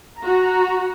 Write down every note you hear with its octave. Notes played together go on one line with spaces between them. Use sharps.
F#4 A#5